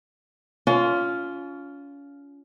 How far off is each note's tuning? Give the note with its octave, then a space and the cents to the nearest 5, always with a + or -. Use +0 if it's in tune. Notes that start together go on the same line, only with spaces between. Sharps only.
C#4 +35 F4 +0